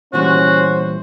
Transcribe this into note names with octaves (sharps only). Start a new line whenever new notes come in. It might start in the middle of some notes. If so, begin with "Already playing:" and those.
A#2 E3 G3 C#4 F#4 C5